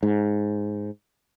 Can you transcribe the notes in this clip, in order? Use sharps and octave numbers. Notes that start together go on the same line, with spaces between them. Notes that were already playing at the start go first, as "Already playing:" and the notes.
G#2